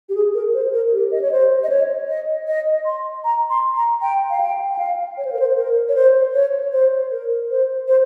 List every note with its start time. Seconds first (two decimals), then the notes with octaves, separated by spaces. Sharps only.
0.09 G4
0.15 G#4
0.34 A#4
0.54 C5
0.73 A#4
0.92 G4
1.11 D#5
1.21 C#5
1.31 C5
1.63 D#5
1.70 C#5
2.08 D#5
2.48 D#5
2.85 C6
3.24 A#5
3.50 C6
3.76 A#5
4.02 G5
4.30 F5
4.41 G5
4.74 G5
4.79 F5
5.17 C#5
5.25 C5
5.32 A#4
5.40 C5
5.56 A#4
5.88 C#5
5.95 C5
6.34 C#5
6.73 C5
7.11 A#4
7.50 C5
7.88 C5